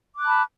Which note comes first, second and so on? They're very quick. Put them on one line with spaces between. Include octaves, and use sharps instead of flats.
D6 F#6 A5 B5